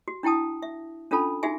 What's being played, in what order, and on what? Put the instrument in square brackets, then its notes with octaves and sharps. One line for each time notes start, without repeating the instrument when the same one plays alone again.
[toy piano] F#4
D4 E4 G5 A5 D#6
E5
C#4 D4 F4 A4 A5 B5
D#4 F#4 G#4 E5 G#5